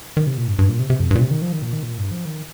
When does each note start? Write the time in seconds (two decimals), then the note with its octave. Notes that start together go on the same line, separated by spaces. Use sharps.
0.17 D#3
0.27 C3
0.37 A#2
0.47 G2
0.59 G2
0.69 A#2
0.79 C3
0.90 C3
1.00 F2
1.11 G2
1.15 A#2
1.21 C3
1.31 D#3
1.42 F3
1.52 D#3
1.62 A#2
1.73 D#3
1.83 A#2
1.98 G2
2.11 F3
2.25 D#3